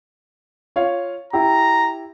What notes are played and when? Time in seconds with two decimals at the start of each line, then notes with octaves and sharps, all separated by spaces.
0.76 F4 C#5 F5
1.33 E4 G4 A#5